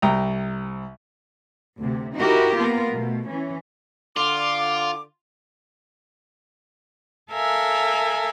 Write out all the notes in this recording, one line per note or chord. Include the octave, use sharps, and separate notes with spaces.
C2 G5 A#5
D2 C3
D#4 E4 F#4 G4 A#4
A#3 B3 F4 A#4
B2 A3
E3 C#4
D3 F4 D6
A4 A#4 E5 F5 G#5